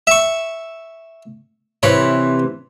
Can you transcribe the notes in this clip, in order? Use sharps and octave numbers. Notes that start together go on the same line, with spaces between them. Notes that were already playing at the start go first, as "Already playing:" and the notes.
E5 C#6
C3 E3 C#5 B5